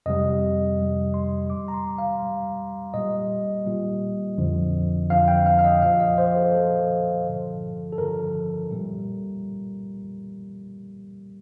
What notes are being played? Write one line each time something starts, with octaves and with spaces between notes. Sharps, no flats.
F2 C3 G3 D#5
F2 C3 G3
C6
A#2 G3 D6
A#5
C6
F5
A#2 G3
A#2 G3 D#5
A#2 G3
F2 D3 F3
F2 D3 F3 F5
G5
F5
F5
D#5
A#2 F3 F5
D#5
C5
A4
A#2 F3 A4
G2 D3 F3
A4
G2 D3 F3 A#4
A#2 G3